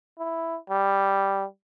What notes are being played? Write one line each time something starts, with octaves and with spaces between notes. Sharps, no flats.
E4
G3